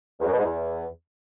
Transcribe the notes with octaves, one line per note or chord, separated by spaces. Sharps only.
E2
F#2
B2
G#2
E2